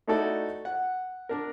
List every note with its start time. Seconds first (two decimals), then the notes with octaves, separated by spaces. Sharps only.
0.07 A3 D#4 E4 F#4 A4 D5
0.65 F#5
1.29 D4 A#4